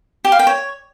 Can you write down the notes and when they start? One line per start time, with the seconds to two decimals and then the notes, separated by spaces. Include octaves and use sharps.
0.25 G4
0.32 F5
0.39 G5
0.47 C#5